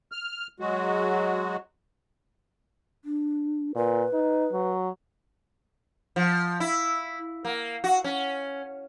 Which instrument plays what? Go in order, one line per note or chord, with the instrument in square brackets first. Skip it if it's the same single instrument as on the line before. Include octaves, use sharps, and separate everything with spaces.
[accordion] F6
F#3 G#3 F#4
[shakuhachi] D4
[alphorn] A#2 [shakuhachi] B4
[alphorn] D#4
F#3
[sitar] F3
E4
A#3
F#4
C#4